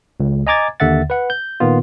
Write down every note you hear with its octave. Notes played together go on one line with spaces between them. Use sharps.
C#2
D#5 G#5 A#5 D6 G#6 A6
D#2 D3 E5 F#5 A6
B4 F#5
G6
A#2 D#3 B3 F4